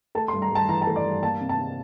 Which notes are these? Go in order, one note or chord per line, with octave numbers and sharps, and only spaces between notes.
A3 A5
C6
G2
A#5
G2 A5
E3 A#5
A5
A3
D5
G2
A#3 A5
C3
A5
C3